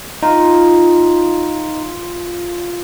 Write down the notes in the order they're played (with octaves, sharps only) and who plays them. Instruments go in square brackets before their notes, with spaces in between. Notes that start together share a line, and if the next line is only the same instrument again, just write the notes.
[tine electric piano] D#4 [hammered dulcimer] F4